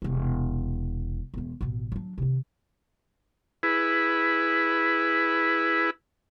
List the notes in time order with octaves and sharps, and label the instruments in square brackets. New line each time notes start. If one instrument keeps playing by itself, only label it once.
[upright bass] E1 C3
E1 E3
A1 B2
F#3 D4
C3 D#3
[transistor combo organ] E4 G#4 B4